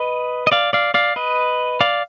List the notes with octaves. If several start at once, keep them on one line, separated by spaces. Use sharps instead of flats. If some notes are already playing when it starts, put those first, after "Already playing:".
Already playing: B4 D#5
D#5
D5 F5
D5 F5
D5 F5
B4 D#5
D5 F5